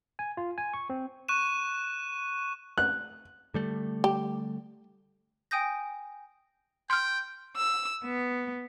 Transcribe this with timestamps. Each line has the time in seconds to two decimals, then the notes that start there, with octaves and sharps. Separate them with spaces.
0.19 G#5
0.37 F4
0.58 G#5
0.74 C#6
0.90 C4
1.28 C#6 F#6 D#7 E7
2.78 F#6
3.54 D3 G3 A3
4.04 G4
5.51 G5 G#5 D#6 G6 A#6
6.90 G5 C6 F6
7.56 E6
8.04 B3